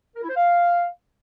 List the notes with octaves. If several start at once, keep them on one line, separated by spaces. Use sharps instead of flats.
A#4
E4
C5
F5